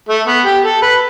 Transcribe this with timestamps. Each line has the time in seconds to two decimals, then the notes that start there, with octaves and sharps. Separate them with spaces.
0.09 A3
0.27 B3
0.46 G4
0.64 A4
0.82 B4